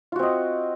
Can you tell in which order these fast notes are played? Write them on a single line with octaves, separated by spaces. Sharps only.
F4 F#4 C4 D#5